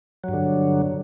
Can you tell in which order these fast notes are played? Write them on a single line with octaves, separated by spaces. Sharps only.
F#3 G2 D3